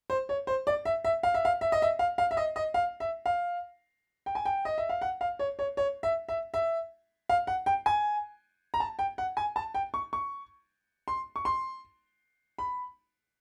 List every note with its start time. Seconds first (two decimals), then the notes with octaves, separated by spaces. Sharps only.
0.10 C5
0.29 C#5
0.47 C5
0.67 D5
0.85 E5
1.05 E5
1.23 F5
1.34 E5
1.45 F5
1.61 E5
1.72 D#5
1.82 E5
1.99 F5
2.18 F5
2.31 E5
2.37 D#5
2.56 D#5
2.74 F5
3.00 E5
3.26 F5
4.26 G5
4.35 G#5
4.45 G5
4.65 D#5
4.78 E5
4.89 F5
5.02 F#5
5.21 F5
5.39 C#5
5.59 C#5
5.77 C#5
6.03 E5
6.29 E5
6.54 E5
7.29 F5
7.47 F#5
7.66 G5
7.86 G#5
8.74 A#5
8.80 A5
8.99 G5
9.18 F#5
9.37 G#5
9.56 A5
9.75 G5
9.94 C#6
10.13 C#6
11.08 C6
11.36 C#6
11.45 C6
12.58 B5